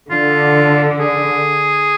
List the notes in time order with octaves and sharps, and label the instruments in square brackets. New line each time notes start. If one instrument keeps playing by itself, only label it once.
[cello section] D3 [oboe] F4
[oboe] G#4